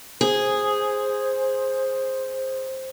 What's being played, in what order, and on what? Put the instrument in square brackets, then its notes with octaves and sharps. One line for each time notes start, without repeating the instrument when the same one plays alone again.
[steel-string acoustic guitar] G#4 [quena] C5